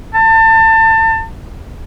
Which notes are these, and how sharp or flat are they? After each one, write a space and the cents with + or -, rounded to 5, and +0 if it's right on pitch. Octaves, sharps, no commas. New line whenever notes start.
A5 +30